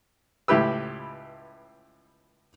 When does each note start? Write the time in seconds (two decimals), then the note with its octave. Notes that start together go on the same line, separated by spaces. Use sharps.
0.48 C#2 A2 E4 G4 B4 E6